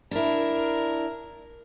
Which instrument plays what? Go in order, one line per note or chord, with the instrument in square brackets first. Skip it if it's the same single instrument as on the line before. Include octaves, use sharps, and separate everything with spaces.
[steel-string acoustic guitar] D4 E4 [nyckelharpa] A#4